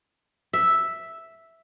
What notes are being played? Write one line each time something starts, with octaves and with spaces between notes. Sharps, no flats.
E5